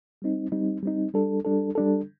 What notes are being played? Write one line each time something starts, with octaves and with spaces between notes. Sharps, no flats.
G3 C4 D#4
G3 C4 D#4
G3 C4 D#4
G3 D4 A4
G3 D4 A4
G3 D4 A4